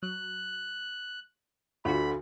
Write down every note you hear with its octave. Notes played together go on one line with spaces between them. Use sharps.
F#3 F#6
D2 D3 F4 F#4 B5